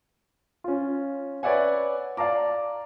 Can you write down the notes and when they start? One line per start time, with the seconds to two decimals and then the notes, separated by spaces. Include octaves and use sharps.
0.64 C#4 F4
1.43 B4 C#5 D5 E5 F#5 G#5
2.17 D5 F5 A5 A#5 D6